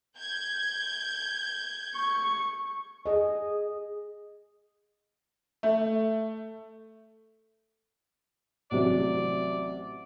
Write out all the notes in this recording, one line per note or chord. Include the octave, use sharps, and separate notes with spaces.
G6 G#6
C#6
G#4 D#5
A3
A1 C3 F#3 D5